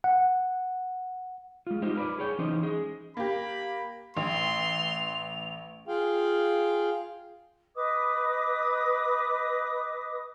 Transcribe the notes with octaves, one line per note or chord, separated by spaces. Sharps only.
F#5
G#3 F4
D#4 F4 G4 C5 D#5
A#4 B4 D5
G#4 C#5 G5
E3 C#4 D#4 C5 D#5
G#4 D#5
A#3 G4 B5
A1 C6 F7
F4 G#4 F5 G5
B4 D#5 D6 D#6